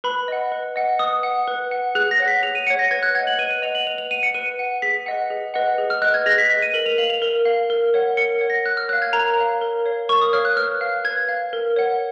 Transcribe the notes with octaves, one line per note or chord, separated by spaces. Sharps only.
B4 B5
D#5 F#5
B4
D#5 F#5
B4 D#6
F#5
B4
F#5
G#4 F#6
A#6
C#5 F#5
B6
G#4 F7
D#7
C#5 F#5 C#7
A#6
B4 G#6
F#6
D#5 F#5 G#6
F#7
B4 D#7
D#7
D#5 F#5 F7
F#7
B4 F7
F7
F#5 D#7
C#7
B4 D#7
F#5
G#4 B6
B4 D#5 F#5
G#4
B4 D#5 F#5
G#4
F6
B4 D#5 F#6
G#6
G#4 A#6
B6
B4 D#5 B6
D#7
A#4 F#7
F7
F5 F#7
F7
A#4
F5
A#4
C#5 F#5
A#4 C#7
C#5 F#5
A#6
A#4 F#6
F6
C#5 F5 F#6
G#6
A#4 A#5
C#5 F5
A#4
C#5 F5
A#4 C#6
D#6
C#5 F5 F6
F#6
B4 F6
F5
B4 G#6
F5
A#4
C#5 F#5